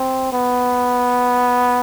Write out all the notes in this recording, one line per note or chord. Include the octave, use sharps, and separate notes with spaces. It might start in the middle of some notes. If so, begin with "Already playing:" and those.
Already playing: C4
B3